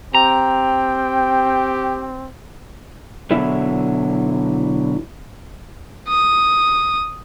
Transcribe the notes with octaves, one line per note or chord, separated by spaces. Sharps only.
C4 G4 G5 A#5
B2 D3 F#3 E4 E5
D#6